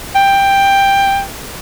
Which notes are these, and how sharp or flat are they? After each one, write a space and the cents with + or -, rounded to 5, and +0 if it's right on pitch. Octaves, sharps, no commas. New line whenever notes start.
G5 +10